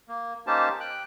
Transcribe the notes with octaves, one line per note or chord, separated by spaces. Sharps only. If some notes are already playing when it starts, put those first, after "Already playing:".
A#3
A#3 C#4 D#4 G4 C5 A5
G5 F#6